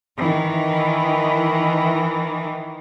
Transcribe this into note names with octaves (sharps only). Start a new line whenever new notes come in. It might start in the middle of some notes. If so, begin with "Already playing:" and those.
D#3 E3